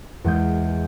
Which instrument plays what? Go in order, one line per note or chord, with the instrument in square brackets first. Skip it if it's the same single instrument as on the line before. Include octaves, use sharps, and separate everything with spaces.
[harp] E2 G#3 G6